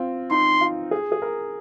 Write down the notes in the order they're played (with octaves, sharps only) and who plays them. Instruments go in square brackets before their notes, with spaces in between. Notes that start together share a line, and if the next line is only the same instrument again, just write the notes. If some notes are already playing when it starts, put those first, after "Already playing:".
Already playing: [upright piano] C4 F4
[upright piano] D#4 [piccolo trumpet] C6
[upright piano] F4
G#4
G#4
A#4